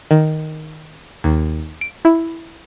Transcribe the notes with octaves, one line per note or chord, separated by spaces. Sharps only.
D#3
D#2
D7
E4